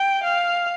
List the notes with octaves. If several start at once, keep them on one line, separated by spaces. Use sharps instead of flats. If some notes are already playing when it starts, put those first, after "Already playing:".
Already playing: G5
F5